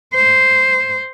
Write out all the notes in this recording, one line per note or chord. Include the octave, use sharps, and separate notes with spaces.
C5